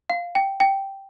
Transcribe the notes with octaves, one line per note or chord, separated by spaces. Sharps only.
F5
G5
G5